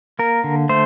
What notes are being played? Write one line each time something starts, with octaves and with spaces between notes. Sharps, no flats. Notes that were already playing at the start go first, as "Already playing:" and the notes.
A#3 A#4
D3
A3 C5